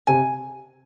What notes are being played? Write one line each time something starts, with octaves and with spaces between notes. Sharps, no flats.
C3 G#5